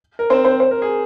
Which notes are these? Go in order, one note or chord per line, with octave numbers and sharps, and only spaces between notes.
A#4
C4 C5
C4 C5
C5
A#4
G#4